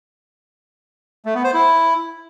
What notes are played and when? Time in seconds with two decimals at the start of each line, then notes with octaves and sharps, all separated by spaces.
1.25 A3
1.35 B3
1.44 C5
1.54 E4